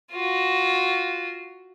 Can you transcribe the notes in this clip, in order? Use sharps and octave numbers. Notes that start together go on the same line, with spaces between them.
F4 F#4